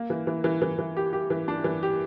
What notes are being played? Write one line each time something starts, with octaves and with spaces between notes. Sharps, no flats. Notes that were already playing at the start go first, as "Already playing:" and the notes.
Already playing: A#3
E3
E3
E3
E3
E3
G4
G4
E3
D4
E3
G4